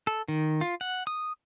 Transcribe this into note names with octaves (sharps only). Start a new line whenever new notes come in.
A4
D#3
F4
F#5
D#6